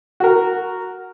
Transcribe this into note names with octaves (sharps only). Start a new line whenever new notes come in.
F#4 A#4